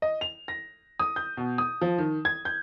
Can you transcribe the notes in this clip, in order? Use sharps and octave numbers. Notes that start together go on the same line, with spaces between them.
D#5
F7
A#6
D#6
G6
B2
D#6
F3
D#3
G#6
G6